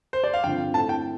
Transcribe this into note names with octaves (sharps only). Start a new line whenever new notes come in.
C5
D5
F5
G2 D3 F3 C4 G5
A2 A3 C4 A4 A5
G5